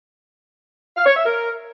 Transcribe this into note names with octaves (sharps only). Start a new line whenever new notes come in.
F5
C#5
E5
A#4